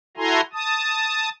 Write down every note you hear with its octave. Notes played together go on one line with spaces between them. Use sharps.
E4 F#4 A4 G#5 A#5 C6
A5 D#6